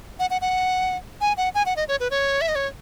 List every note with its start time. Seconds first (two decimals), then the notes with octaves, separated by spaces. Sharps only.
0.19 F#5
0.30 F#5
0.41 F#5
1.21 G#5
1.37 F#5
1.55 G#5
1.66 F#5
1.76 D#5
1.88 C#5
2.00 B4
2.11 C#5
2.41 E5
2.48 D#5
2.55 C#5